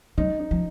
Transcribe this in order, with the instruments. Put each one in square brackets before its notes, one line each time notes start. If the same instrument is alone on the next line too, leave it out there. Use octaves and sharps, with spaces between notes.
[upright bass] F#3 [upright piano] D#4
[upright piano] D#4
[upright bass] F3